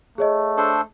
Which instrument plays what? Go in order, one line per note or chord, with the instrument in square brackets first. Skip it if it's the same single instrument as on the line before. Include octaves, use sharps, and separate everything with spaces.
[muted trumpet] A3 [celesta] G#4 C#5 D#5
[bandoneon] D4 A4 C5